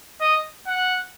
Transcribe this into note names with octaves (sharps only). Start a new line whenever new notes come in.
D#5
F#5